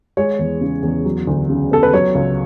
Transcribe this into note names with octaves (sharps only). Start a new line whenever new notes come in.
G#3 C#5
E2
C#3
E2
F#3
D2
C#3
B3 A4
B4
F#3 C#5
C#2